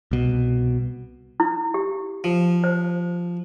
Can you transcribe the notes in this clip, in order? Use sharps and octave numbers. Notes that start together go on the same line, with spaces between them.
C2 B2
E4
G4
F3
C5